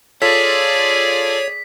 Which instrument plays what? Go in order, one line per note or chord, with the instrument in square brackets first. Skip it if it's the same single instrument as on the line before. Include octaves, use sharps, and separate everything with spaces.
[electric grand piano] F4 A4 [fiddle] G#4 D5 [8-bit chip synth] C#5 [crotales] B6